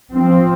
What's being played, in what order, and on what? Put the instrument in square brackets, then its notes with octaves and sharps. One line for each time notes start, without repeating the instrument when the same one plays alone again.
[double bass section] F3 C4